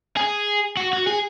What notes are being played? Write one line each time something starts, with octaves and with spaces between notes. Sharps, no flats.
G#4
F#4
F#4
G#4